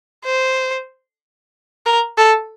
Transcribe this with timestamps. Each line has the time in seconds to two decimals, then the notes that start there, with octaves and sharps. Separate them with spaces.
0.25 C5
1.86 A#4
2.18 A4